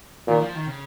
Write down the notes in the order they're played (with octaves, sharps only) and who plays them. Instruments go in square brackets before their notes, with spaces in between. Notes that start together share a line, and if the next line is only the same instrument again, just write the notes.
[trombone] A#2 [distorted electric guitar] D#3
[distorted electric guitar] F3
D#3
C#3